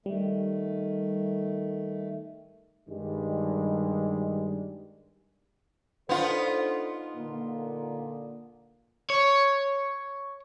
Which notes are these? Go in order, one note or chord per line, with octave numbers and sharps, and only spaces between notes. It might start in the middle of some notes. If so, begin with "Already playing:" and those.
D#3 G3 A3
G2 D#3 G3 G#3
B3 D4 D#4 F4 A4 C5
A#2 D3 A#3
C#5